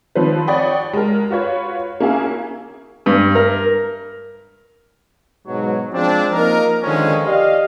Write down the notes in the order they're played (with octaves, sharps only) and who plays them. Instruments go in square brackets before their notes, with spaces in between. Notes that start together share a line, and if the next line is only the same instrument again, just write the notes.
[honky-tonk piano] D#3 F3 C4 B4
C#5 D5 F#5 G5 B5 D#6
G#3 A#4
F4 F#4 B4 C#5
A#3 C#4 E4 F#4 G#4
[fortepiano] G2
A#4
[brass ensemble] G#2 B2 F#3
F3 G#3 C4 D4
F3 A#3 D#4 A#4
D3 D#3 F3 G#3 C#4
G4 D5 D#5 F5